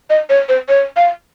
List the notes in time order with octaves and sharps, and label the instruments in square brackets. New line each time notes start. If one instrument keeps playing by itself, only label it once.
[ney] D#5
C#5
C5
C#5
F5